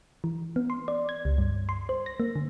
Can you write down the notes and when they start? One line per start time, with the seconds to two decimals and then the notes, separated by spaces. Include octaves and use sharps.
0.24 E3
0.56 B3
0.70 C6
0.88 D5
1.09 G#6
1.25 C#2
1.38 G2
1.69 C6
1.89 C5
2.06 A#6
2.20 A#3
2.36 D3